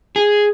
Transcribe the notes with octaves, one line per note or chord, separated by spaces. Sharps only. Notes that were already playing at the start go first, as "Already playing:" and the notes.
G#4